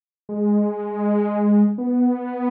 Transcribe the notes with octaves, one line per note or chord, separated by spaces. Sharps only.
G#3
B3